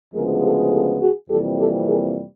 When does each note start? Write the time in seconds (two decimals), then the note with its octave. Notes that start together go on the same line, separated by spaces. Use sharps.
0.14 D2 C#3 F3 G#3 B3 G#4 A#4
0.43 G4 A4
0.72 G4 A4
1.02 F#4 G#4
1.30 F2 C3 E3 G3 A#3 G4 A4
1.59 G4 A4
1.87 G#4 A#4